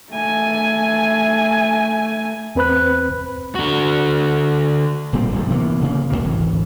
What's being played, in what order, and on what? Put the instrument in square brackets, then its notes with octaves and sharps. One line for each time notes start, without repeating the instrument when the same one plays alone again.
[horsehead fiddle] A3 G#5
[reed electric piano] E2 C4 B4 C5 B5 F#6
[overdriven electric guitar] D3 F#4
[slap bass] D1 A#2 G3 C4
F#1 D#2 A2
C3 E3 A#3 B3
D1 C#3 A#3
C2 F2 C3 A#3
D1 G#1 E3